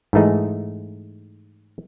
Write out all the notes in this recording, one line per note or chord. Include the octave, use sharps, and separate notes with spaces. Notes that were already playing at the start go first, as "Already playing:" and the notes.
G#2 E3 A3 D#4 G#4